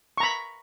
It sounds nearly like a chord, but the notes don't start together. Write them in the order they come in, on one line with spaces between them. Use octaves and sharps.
C#6 A#5 B5